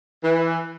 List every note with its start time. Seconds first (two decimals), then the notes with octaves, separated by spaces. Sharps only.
0.23 E3